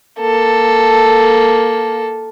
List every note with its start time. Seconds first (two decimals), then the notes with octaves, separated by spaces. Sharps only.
0.19 A#3 A4